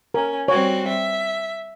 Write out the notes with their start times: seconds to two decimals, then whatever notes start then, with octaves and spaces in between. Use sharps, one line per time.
0.14 C#4 A#4
0.48 G3 C4 F#4 C#5
0.88 E5